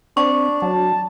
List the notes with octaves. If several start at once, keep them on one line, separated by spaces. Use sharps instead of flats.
C4 D4 C#6
F#3 A5